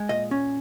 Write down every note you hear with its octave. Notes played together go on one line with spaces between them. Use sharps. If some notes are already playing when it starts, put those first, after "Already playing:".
Already playing: G#3
A#2 D#5
C#4